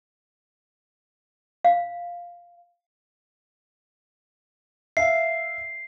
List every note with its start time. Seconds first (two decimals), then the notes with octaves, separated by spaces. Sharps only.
1.65 F5
4.97 E5 F5 C7